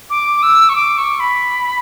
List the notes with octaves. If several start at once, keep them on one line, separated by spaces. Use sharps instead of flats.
D6
E6
C#6
D6
C#6
B5